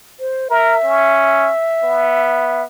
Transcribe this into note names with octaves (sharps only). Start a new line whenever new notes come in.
C5
A#4 E5
C#4
B3